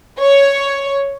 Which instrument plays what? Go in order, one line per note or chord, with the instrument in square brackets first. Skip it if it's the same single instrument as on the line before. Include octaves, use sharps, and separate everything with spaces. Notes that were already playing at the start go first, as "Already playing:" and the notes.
[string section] C#5